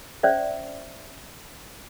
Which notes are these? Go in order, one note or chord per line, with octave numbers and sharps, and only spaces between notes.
C#4 C5 D5 E5